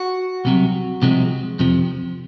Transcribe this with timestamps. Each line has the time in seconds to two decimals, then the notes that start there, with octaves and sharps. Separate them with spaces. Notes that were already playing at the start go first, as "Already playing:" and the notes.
Already playing: F#4
0.45 C2 C3 F#3
1.02 C2 C3 F3 G#3
1.59 F2 C3 F3